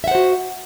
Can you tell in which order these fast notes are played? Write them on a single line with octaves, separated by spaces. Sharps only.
E5 F#5 C5 F#4